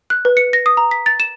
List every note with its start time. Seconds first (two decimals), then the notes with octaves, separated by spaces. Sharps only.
0.10 F#6
0.25 B4
0.37 C#7
0.53 A#6
0.66 D#6
0.77 A#5
0.91 B6
1.06 A6
1.20 E7